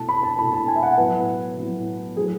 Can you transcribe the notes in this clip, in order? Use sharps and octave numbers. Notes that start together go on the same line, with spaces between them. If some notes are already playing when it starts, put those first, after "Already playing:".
Already playing: B2 A3 E4 A5
B5
A5
B2 A3 E4 B5
A5
G#5
E5
F#5
A2 F#3 B3 E4 B4
A2 F#3 B3 E4
F#3 A3 E4 G#4